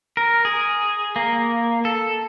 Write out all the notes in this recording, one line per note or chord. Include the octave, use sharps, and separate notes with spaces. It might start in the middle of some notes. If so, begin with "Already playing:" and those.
A#4
G#4
A#3
A4